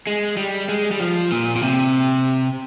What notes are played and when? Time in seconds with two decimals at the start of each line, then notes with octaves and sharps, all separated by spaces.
0.07 G#3
0.37 G3
0.69 G#3
0.91 G3
1.00 F3
1.32 A#2
1.56 A#2
1.62 C3